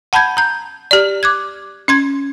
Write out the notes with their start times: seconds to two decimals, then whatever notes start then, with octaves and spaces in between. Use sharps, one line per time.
0.13 F#5 A5 B5 G6 G#6
0.37 A#5 G6
0.91 G4 D5
1.23 D6 F#6 G#6
1.88 C#4 C6 G#6